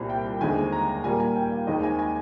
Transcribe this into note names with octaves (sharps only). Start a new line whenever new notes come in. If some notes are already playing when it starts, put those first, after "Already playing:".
Already playing: C2 A#2 G3 C4
G5
D#2 D3 G#3 C4 G#5
A#5
A#2 G3 A#3 G#5
G#5
G5
F5
D#2 D#3 G#3 C4 D#5
G#5
G#5